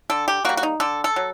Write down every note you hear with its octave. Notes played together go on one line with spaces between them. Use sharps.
D3 A4
G4
G3 A#3 F#4
F#4
D#4
D3 A4
A4
F#3